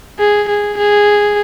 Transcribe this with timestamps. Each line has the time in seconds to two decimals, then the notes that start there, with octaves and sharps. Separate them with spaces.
0.19 G#4
0.48 G#4
0.77 G#4